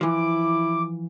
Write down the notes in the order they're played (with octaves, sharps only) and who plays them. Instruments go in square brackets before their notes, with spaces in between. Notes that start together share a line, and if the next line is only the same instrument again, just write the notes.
[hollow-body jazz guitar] E3 F3 [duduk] E4 [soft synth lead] D6